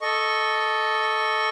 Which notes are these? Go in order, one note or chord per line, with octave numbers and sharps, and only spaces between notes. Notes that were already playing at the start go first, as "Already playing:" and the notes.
A4 D#5 C#6